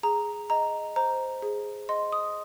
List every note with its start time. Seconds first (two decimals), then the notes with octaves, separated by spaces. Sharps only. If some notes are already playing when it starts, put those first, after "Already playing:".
0.03 G#4 A#5
0.50 D#5 A#5
0.96 C5 A#5
1.42 G#4
1.89 D#5 C6
2.12 D#6